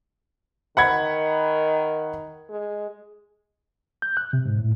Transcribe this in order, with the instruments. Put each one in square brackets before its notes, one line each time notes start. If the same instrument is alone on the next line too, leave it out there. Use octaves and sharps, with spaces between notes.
[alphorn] D#3 [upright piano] F#5 B5 G#6
[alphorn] G#3
[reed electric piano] G6
F#6
C3
G#2
A2